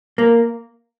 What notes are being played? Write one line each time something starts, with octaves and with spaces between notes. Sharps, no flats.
A#3